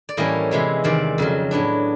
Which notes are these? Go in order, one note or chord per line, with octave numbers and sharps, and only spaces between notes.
D5
A2 E3 G3 A#3 C#4 D#5
C3 E3 G#3 B3
E2 C3 D#3 D5
F2 C#3 F#3
A2 F#3 B3 D4